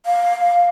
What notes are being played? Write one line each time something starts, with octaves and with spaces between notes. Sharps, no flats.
F5